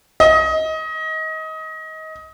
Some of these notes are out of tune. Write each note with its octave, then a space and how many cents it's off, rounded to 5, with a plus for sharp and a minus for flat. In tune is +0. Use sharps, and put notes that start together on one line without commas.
D#5 +25